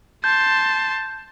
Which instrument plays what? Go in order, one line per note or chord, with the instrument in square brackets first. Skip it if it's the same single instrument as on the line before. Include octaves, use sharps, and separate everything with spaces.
[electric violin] A5 C6 [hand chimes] G6